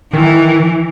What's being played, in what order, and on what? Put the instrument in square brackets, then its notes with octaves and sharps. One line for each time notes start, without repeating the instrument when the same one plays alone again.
[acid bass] D#3 [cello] E3